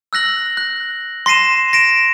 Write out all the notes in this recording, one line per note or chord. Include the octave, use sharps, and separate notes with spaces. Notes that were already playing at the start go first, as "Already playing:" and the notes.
E6 F#6 A#6 F#7
F#6
C6 A#6 C7 D#7 E7
A#6 D7 E7